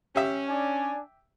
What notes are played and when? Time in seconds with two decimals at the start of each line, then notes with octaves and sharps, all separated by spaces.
0.16 C#4 G4 E5
0.49 D4 D5 G#5